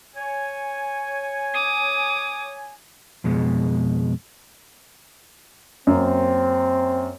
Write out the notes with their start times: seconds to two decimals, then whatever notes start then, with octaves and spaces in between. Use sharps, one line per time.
0.16 C#5 G#5
1.54 D6 D#6
3.24 F2 B2 G#3
5.87 F#2 A#3 C4